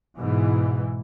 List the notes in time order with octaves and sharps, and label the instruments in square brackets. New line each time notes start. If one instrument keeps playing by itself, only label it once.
[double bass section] G#2 B2 E3